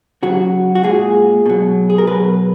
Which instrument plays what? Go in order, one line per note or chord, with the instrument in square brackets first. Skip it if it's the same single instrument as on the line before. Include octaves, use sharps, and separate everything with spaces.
[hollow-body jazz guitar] C#3 F#3 F#4
F#4
A#2 G#3 G#4
B2 F#3
G#4
A#4
B2 F#3 B4